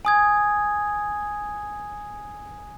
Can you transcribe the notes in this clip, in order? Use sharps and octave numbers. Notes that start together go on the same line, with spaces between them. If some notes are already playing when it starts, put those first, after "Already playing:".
G#5 D#6 G#6